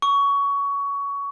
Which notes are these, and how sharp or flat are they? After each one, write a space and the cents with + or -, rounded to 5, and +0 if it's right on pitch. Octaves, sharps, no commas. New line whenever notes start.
C#6 +20